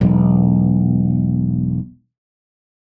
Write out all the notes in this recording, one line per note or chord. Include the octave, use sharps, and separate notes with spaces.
E1 B1